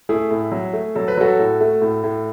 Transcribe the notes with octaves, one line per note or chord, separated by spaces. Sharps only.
A3 E4 G#4
A2
F#3
A3
F#3 A4
B4
F#3 F#4 A4
A2
A3
A2
A2